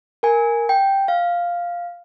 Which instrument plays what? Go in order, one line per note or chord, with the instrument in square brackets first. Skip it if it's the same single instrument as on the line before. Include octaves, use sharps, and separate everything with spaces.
[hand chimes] A#4 G#5
G5
F5